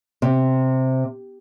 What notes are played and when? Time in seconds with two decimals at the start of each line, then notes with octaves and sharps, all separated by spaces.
0.22 C3